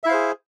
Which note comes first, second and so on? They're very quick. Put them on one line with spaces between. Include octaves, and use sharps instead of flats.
E5 E4 F5 C5 G#4